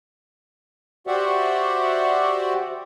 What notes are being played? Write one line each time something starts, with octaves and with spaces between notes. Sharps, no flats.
F#4 G4 C5 D5 E5 F#5